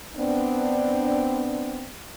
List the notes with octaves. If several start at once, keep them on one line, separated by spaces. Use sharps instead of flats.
B3 C4 D4